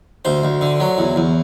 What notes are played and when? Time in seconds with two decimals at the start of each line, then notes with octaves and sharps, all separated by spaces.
0.25 D2 C5
0.44 D2
0.61 D3
0.80 F#3
0.98 E2
1.16 E2